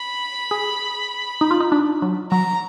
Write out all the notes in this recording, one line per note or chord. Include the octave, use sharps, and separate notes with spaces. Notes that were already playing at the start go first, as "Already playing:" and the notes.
Already playing: B5
G#4
D#4
F4
D#4
D4
F#3
F#3 A#5